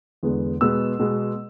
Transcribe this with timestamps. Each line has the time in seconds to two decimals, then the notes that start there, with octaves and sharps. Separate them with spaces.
0.23 E2 D3 G#3 B3
0.61 B2 G#3 B3 E6
0.99 B2 G#3 B3